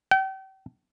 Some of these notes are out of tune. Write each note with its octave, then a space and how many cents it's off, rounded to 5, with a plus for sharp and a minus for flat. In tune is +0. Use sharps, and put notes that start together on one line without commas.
G5 -40